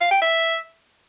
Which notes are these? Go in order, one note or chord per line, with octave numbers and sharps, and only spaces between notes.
F5
G5
E5